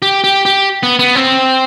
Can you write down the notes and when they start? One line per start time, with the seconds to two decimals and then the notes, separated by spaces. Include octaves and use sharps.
0.02 G4
0.24 G4
0.45 G4
0.83 B3
0.99 B3
1.15 C4